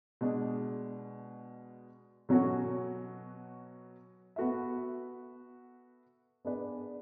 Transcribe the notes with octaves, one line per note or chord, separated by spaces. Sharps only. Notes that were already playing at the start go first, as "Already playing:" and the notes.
B2 G#3 D4
B2 F#3 C#4 F#4 A4
B3 F#4 A4 E5
B3 D4 G#4 B4 D5